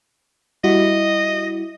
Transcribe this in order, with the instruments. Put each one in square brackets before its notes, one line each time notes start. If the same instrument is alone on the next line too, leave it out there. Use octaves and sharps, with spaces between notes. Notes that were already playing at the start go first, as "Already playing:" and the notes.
[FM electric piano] G3 E4 F#4 [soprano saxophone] D#5